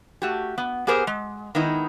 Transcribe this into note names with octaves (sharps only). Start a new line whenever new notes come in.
A3 F#4 G4
B3
B3 G4 G#4 A#4 C5
G#3
D#3 G#3 B3 D#4 E4